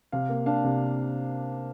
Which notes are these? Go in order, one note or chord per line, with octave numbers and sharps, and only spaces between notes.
C3 F5
A#3
D4 F5
C3